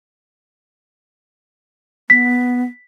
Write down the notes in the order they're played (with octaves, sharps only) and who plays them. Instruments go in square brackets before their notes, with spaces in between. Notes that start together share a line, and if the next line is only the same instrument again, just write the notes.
[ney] B3 [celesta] B6